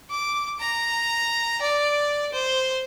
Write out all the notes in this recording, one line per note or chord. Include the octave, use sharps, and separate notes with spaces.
D6
A#5
D5
C5